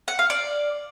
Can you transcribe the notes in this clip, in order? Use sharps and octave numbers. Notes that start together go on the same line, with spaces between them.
F#5
F5
D5